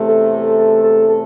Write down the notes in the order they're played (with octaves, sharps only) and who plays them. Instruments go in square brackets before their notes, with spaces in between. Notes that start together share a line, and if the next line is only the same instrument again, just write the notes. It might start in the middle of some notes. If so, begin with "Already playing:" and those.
Already playing: [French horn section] E2 C3 A3
[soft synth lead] A4
A4
A4
A4